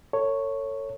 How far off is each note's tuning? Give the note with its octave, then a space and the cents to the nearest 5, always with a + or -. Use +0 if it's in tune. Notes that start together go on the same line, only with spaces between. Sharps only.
A4 +35 C#5 +0